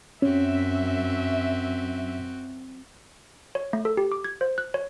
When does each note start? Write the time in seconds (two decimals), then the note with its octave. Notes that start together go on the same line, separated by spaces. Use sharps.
0.22 F#2 C4 C#4 F#4 E5
3.55 C#5
3.73 A3
3.85 A4
3.97 G4
4.12 D6
4.24 G#6
4.41 C5
4.58 F#6
4.74 C#5